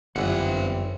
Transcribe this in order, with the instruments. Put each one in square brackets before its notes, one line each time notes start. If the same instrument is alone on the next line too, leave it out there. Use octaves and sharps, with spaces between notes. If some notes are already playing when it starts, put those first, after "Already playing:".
[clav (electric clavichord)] G1 E3 [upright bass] F#2 [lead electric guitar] C4 F#5